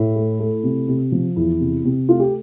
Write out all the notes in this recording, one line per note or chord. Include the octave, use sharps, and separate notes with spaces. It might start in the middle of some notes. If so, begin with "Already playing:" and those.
Already playing: A2 E4
A3
A3
C3
C3
F3
E2 E4
C3
C3
A3 F4
G4